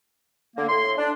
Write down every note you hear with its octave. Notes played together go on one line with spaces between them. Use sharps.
D3 A#3
A2 C6
D4